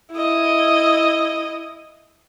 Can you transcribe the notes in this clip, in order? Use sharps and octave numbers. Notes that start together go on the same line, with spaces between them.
E4 D#5